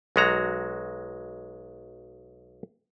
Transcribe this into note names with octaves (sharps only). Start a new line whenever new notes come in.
B1 F#3 G#3 F#4 A#5